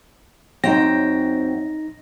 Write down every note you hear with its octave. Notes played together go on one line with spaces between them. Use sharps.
F#2 C4 D#4 G5 A#6